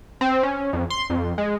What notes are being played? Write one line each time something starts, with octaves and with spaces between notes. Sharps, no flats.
C4
C#4
F2
C6
F2
G#3